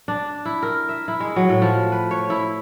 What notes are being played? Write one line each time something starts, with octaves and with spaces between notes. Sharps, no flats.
D4
E4
A#4
E5
E4
G#3
F#3
A2
F3
B4
C#5
E4